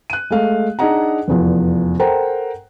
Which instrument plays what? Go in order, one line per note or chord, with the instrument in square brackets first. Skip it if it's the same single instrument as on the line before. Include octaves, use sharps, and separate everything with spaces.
[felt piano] F#6 D#7
G#3 A3 F5
D4 D#4 G#4 D#5 F#5 A#5
F1 E2 F3
A4 A#4 C5 F#5 G5 A#5